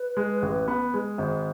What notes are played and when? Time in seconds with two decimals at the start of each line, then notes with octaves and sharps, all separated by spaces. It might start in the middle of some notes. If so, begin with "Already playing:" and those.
Already playing: B4
0.17 G#3
0.42 A1
0.68 B3
0.94 G#3
1.18 G#1